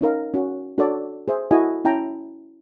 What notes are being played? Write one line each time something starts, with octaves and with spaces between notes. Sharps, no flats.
C#4 D#4 A#4 F5
C#4 F#4
D4 F#4 A4 C#5 D5
G#4 C5 E5
E4 F#4 A4 D#5 G#5
C#4 E4 G5 A5 A#5